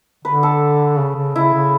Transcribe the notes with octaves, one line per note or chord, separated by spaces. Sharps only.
D3 B4
A4
C#3
C#3
C#3 E4
C#3